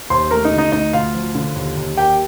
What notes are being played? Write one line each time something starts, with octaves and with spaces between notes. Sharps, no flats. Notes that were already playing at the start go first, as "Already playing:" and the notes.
D#2 C5 C6
A3 A#4 A#5
D#4 D#5
D3
D#4 D#5
D2 D#4 D#5
D2 F4 F5
F3
D3
D#2
D#2
A#3 G4 G5